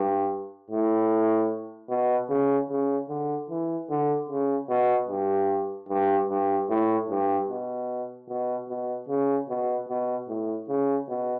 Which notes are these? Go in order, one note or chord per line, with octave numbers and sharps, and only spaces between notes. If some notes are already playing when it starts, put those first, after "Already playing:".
Already playing: G2
A2
B2
C#3
C#3
D3
E3
D3
C#3
B2
G2
G2
G2
A2
G2
B2
B2
B2
C#3
B2
B2
A2
C#3
B2